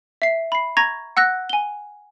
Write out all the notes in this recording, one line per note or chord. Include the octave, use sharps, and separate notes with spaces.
E5 C7
B5 C7
A#5 C#6 G#6 A#6
F#5 E6 F#6 A#6
G#5 G7